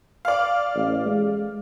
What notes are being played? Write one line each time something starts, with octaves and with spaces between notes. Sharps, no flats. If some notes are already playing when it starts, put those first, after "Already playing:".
D5 F5
A1
G#3